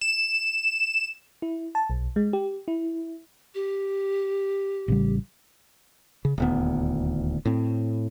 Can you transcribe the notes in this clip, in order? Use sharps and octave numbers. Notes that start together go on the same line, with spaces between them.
E7
E4
A5
B1
G#3
G4
E4
G4
A1 C#3 G3
C#3
D#1 D2 B3
A2 C4